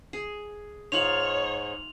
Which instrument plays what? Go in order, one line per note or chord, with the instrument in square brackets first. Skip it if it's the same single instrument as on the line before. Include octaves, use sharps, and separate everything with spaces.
[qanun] G#4
[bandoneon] G#2 [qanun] D#4 F4 [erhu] C#5 [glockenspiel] F7 F#7